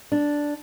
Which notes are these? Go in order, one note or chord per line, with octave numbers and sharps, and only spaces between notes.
D4